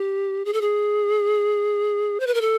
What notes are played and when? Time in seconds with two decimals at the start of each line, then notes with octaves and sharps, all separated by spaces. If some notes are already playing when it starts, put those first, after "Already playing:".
Already playing: G4
0.45 G#4
0.53 A4
0.61 G#4
2.20 C5
2.27 B4
2.34 A#4
2.41 A4